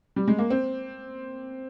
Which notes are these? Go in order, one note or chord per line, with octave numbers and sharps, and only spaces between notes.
G3
G#3
A#3
C4